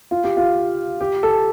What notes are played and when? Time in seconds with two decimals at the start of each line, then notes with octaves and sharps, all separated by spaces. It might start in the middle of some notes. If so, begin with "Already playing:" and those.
0.11 F4
0.24 G4
0.37 F4
1.01 G4
1.23 A4